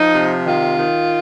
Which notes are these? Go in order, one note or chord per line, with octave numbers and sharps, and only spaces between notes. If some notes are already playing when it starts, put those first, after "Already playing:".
Already playing: F3 D#4
C3
D#3 F4
D#3